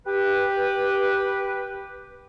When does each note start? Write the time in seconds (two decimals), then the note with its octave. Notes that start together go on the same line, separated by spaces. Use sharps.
0.07 G4 B4